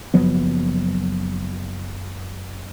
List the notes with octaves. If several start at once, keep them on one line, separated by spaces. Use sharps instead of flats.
F#1 F3 F#3 B3